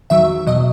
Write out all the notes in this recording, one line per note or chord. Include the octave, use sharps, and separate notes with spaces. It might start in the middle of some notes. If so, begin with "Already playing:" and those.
E2 D#3 F#3 E5
E2 B2 F#3 D#5